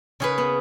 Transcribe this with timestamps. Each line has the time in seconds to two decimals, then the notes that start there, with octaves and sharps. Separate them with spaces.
0.20 C#3 G#4 B4
0.38 B3